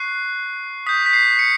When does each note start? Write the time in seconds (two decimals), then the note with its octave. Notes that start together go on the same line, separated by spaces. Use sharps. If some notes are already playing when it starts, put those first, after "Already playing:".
Already playing: C#6 F#6 C7
0.86 D#6 G6 B6
1.06 B6
1.13 C7
1.39 C#7